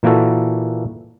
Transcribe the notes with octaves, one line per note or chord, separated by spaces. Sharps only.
A#2 E3 A#3 F#4 A4